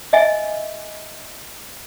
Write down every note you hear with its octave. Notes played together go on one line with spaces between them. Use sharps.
D#5 E5 G#5